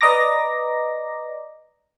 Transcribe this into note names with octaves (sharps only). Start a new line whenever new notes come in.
B4 D5 D#5 A#5 D6 A#6